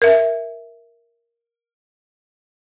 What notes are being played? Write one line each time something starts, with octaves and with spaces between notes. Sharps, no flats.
A#4 E5